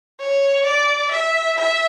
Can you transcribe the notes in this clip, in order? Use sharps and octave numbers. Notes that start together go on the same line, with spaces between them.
C#5
D5
E5
E5